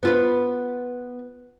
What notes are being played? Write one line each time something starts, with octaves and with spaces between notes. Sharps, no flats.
B3 F4 B4